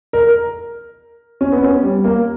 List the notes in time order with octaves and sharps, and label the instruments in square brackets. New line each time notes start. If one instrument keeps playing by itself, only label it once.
[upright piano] A#4
C#4
B3
C#4
G3
A#3